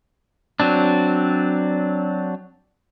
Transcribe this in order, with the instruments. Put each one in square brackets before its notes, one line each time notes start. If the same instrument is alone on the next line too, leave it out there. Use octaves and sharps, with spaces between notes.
[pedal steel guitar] F#3 C4 D4